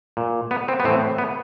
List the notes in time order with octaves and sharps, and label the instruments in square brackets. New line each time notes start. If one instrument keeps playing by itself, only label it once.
[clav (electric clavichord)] A#2
B3
C4
B3
A2 E3 C4
B3